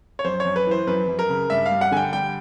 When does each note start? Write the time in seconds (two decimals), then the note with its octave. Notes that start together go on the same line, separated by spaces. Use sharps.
0.19 C#5
0.25 F#2 C5
0.40 C#5
0.45 F#2
0.56 B4
0.67 E3 C5
0.87 F#2 B4
1.08 F#2
1.19 A#4
1.29 C#3
1.50 G2 E5
1.66 F5
1.71 G3
1.81 F#5
1.91 D3 G#5
1.97 G5
2.12 G3 G5